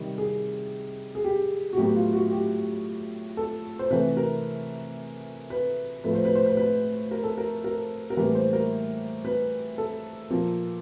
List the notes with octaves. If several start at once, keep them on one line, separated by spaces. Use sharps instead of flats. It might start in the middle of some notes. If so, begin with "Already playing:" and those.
Already playing: C3 D#3 G3
G#4
G#4
G4
F#4
A2 F#3 B3 G4
F4
F#4
G4
A4
C5
C3 E3 A3 B4
A#4
B4
A2 F3 A3 B4
C5
B4
C5
B4
B4
A#4
A4
A#4
A#4
A#4
A2 E3 G3 A#3 B4
C5
A#4
B4
A4
A#2 F3 A#3